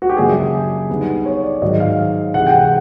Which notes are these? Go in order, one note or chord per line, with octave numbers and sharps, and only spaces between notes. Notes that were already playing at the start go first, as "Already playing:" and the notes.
F#4
G4
F#2 C#3 F#3 A#3 D4 G#4
D3 G3 B3 D#4
C#5
D5
G#2 D#3 F#3 D#5
F5
C3 E3 G#3 F#5
G5
F#5